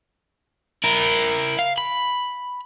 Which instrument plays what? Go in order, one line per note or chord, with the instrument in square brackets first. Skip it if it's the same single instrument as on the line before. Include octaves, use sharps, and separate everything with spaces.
[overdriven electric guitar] E4 A#4
F5
B5